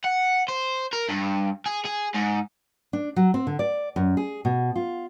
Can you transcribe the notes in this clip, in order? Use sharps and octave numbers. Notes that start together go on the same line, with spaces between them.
F#5
C5
A#4
G2
G#4
G#4
G#2
D4
F#3
C4
D3
D5
F#2
G#4
B2
F4